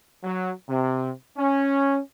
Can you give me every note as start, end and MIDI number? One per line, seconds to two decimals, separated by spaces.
0.24 0.51 54
0.68 1.11 48
1.37 2.00 61